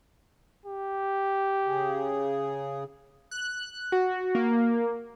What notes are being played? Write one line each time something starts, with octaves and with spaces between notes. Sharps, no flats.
G4
C#3 G#4
F#6
F#4
A#3